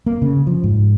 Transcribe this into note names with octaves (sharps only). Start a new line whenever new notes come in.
A#3
C#3
F3
G#2